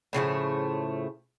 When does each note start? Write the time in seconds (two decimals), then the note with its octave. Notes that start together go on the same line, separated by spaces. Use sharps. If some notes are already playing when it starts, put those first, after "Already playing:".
0.13 A2 C#3 F3 A3